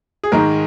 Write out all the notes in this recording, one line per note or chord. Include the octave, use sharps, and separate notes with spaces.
G#4
G#2 D#3 G#3 A#4